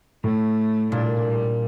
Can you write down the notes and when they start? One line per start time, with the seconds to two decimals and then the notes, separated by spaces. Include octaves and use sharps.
0.24 A2 A3
0.92 A#2 G3 D4 E4
1.26 G3